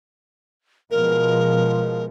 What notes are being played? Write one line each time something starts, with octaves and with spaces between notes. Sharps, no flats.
B2 F3 G#3 A#4